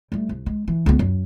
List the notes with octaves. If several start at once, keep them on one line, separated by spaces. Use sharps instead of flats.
G3 A3
C2
G#3
E3
C#2 B3
F#2